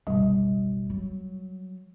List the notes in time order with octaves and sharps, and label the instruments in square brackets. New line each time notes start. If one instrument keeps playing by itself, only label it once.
[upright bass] F#1 B1 [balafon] G3
[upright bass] F#3